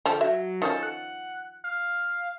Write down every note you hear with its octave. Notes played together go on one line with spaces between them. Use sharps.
D3 F3 G4 A4
F#3 E5
D#3 F3 C#4 A4
F#5
F5